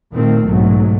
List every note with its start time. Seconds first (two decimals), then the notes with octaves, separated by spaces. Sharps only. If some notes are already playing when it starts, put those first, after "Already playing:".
0.12 A#2 D#3 A3 C4
0.46 B1 G#2 F#3 A3